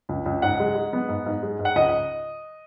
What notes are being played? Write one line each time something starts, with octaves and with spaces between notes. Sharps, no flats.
C#2
C#2
G#2 F#5
G#3
G#3
B3
G#2
G#2
G#3
G#2
F#5
C#2 D#5